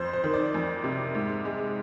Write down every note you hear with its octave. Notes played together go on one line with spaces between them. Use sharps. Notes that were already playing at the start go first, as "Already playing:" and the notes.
Already playing: F2 C5
C5
D#3
D5
F2
C3
G#2
G#3